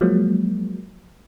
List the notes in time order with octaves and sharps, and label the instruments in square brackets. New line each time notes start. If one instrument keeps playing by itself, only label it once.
[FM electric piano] F3 F#3 G#3 A#3